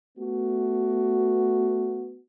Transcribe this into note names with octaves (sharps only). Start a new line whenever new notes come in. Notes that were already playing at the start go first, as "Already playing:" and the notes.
A3 B3 F#4